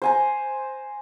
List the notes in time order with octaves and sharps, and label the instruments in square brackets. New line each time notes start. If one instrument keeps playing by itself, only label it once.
[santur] C5 G#5 A#5